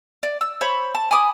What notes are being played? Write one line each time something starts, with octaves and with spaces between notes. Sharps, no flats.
D5
E6
C5 C#5 B5
A5
G#5 B5 D6 D#6